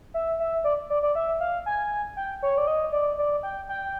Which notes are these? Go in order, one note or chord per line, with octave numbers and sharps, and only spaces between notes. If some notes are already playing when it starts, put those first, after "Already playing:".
E5
E5
D5
D5
D5
E5
F5
G#5
G5
C#5
D5
D#5
D5
D5
G5
G5